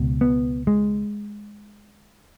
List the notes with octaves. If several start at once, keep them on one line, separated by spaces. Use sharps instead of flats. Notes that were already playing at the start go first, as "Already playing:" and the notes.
Already playing: C#2 B2
B3
G#3